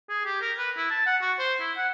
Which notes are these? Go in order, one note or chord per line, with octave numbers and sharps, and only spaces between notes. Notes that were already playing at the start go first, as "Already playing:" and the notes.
G#4
G4
A#4
B4
E4
A5
F#5
F#4
C5
E4
F#5